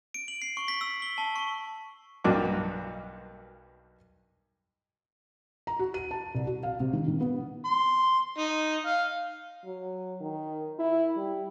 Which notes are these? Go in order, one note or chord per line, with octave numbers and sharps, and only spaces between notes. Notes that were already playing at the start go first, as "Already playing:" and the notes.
D7
F#7
C7
C#6
B6
E6
G7
A5
C#6
B1 G2 A#3 D4 F#4 D6
A#5
F#4
D#7
A5
C2
F#4
F5
C3
D#3
D#3
B3
C6
D#4
F5
F#3
D#3
E4
G3